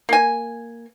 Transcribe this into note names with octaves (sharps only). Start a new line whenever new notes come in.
A#3 G#5